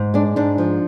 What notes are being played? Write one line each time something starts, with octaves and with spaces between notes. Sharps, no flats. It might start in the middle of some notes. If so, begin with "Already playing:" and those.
Already playing: G#2
G#3 D4
G#2 D4
F3